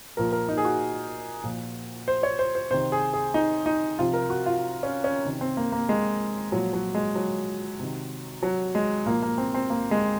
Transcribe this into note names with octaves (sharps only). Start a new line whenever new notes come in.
A#2 F3 A#4
A#4
D#4
G#4
F#4
A#2 F3
C5
C#5
C5
C5
C3 D#3 C5
G#4
G#4
D#4
D#4
C3 F3 F4
A#4
F#4
F4
C#4
C#4
C3 D#3
C4
A#3
A#3
G#3
A#2 F3 F#3
F#3
G#3
F#3
C3 D#3
F#3
G#3
A#2 F3 A#3
A#3
C4
C4
A#3
G#3